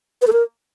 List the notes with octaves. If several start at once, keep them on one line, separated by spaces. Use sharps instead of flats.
B4
A4
A#4